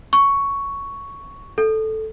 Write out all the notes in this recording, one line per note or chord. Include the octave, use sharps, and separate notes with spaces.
C#6
A4